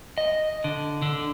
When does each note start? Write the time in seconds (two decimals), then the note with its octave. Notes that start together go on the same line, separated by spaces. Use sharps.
0.18 D#5
0.64 D3
1.02 D3